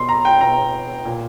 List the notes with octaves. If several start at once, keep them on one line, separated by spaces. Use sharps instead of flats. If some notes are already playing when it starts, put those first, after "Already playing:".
Already playing: B2 C6
A#5
G5
B2 A#5
A#2